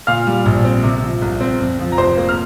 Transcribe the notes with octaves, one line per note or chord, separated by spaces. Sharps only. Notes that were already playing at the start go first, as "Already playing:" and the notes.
A#2 F5 F6
G3
A#1
C4
C3
F3
C2
C4
F2
F3
A#5
F1 C5 C6
A#3
F6